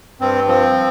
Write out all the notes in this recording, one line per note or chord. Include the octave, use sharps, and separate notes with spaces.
G2 C4
F3 C4